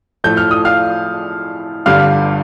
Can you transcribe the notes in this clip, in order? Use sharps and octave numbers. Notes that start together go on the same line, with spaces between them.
A2 F3 A3 G6
F6
D#6
F5 F6
G1 G2 D3 G3 D4 F5 F6